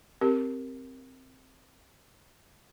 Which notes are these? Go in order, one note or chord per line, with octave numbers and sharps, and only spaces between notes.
C4 G4 A#4